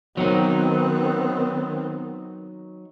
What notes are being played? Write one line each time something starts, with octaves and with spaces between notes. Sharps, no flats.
D#3 F#3 B3 C4 D#4